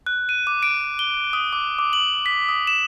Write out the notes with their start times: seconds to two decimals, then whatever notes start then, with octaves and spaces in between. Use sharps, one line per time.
0.06 F#6
0.29 D#7
0.47 D6
0.63 D7
0.99 G7
1.33 D#6
1.53 D6
1.79 D6
1.93 F#7
2.26 B6
2.49 D#6
2.67 E7